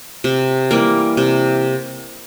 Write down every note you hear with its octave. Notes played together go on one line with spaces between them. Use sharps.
C3
E3 G3 A#3
C3